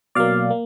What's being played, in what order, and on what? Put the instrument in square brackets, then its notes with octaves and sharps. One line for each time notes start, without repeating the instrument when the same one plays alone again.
[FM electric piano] B2 F#3 A#3 D5 F5
A#3